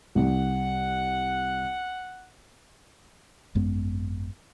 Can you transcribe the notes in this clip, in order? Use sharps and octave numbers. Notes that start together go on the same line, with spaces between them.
C2 F#5
G#1 F#2 G#3 B3